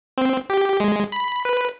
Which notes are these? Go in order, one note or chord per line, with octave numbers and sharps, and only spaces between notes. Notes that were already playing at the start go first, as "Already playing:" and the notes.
C4
G4
G#3
B5
B4